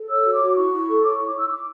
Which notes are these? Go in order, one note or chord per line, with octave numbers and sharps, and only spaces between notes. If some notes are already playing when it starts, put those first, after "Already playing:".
Already playing: A4
C#5 E6
F#4
D6
F#4
E4 C#6
E4
A4
C#5 D6
E4 C#6
D6
E4 E6
C#6
E4 D6